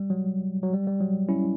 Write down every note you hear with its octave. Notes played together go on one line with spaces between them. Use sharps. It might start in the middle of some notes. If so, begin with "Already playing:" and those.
Already playing: G3
F#3
F#3
G3
G3
F#3
C#4 E4